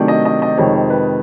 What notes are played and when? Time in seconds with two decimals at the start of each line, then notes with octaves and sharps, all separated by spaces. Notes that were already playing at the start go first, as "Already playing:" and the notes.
Already playing: C3 D#3 F#3 A3 D4
0.08 D#5
0.25 D#5
0.42 D#5
0.57 F2 C3 D#3 G#3 C#5
0.74 C5
0.90 B4